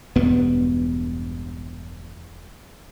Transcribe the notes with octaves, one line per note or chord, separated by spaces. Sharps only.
E1 G2 B2 B3